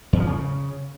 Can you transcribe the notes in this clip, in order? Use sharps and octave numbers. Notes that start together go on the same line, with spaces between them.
E2
F3
C#3